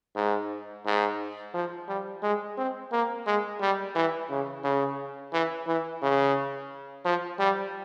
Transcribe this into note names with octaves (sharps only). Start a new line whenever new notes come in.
G#2
G#2
F3
G3
G#3
C4
A#3
G#3
G3
E3
C#3
C#3
E3
E3
C#3
F3
G3